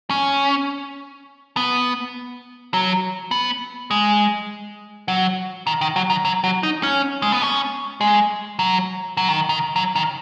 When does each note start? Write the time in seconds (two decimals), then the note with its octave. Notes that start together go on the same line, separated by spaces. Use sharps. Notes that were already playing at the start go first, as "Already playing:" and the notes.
0.10 C#4
1.57 B3
2.74 F#3
3.31 B3
3.91 G#3
5.08 F#3
5.67 D#3
5.81 D#3
5.96 F#3
6.10 D#3
6.25 F#3
6.44 F#3
6.63 D#4
6.83 C#4
7.22 G#3
7.32 B3
7.42 C#4
8.01 G#3
8.59 F#3
9.17 F#3
9.29 D#3
9.49 D#3
9.76 F#3
9.96 D#3